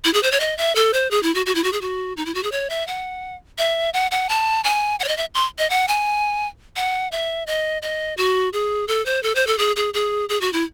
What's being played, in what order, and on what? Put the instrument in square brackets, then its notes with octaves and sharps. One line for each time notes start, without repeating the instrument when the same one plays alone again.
[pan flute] E4
G#4
C5
C#5
D#5
E5
A4
C5
G#4
E4
F#4
F#4
E4
F#4
G#4
F#4
D#4
E4
F#4
G#4
C#5
E5
F#5
E5
F#5
F#5
A5
G#5
F#5
C#5
D#5
E5
C6
D#5
F#5
G#5
F#5
E5
D#5
D#5
F#4
G#4
A4
C5
A4
C5
A4
G#4
G#4
G#4
G#4
F#4
E4